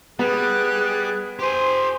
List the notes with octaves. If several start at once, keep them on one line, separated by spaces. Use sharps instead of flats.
G3 B3 G#4 F#6
G4 C5 G#5 C6